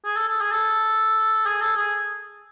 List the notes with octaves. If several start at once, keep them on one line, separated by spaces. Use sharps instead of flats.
G#4
A4
A4
G#4
A4
G#4
A4
G#4